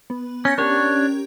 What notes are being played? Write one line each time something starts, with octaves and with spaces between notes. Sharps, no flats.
B3
C#4 G6 A#6 C#7
C#4 D4 G4 A#4 C#5